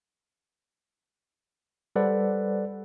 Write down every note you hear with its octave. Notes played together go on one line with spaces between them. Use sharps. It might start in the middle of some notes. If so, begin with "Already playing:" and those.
G3 A4 B4 C5 D5 F#5